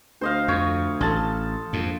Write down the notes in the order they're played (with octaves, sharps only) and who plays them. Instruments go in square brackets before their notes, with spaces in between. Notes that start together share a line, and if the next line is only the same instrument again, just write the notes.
[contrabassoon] D2 [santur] C5 D#5 F5
[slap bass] F2 [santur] C#5
[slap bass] A1 [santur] A4 A5 C6
[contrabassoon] A#1 [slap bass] F2 G#2